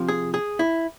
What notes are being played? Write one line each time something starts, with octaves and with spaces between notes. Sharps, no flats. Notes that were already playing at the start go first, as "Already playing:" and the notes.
Already playing: C3 F3
G#4
G#4
E4